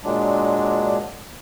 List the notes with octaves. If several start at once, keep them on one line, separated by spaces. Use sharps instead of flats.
A#2 F#3 G#3 D4